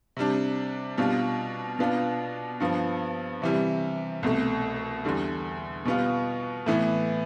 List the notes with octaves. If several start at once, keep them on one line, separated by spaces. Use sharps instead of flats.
C3 G3 D4
B2 G3 D4 F4
B2 B3 D4 F4
G2 F3 B3
C3 E3 G3
C2 B2 A3
E2 D3 G3
B2 G3 B3 F4
A2 E3 B3